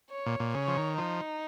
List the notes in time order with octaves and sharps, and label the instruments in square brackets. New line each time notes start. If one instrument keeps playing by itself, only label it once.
[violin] C#5
[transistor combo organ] A#2
A#2
[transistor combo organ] C#3 [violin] C#5
[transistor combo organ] F3
D#3
[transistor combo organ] F3 [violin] D#4